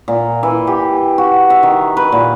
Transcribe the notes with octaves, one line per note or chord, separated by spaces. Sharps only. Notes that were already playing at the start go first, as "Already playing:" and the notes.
A#2
E3
G4
F#4
E5
D#3
B4
A#2